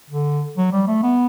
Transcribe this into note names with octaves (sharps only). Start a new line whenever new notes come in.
D3
F#3
G3
A3
B3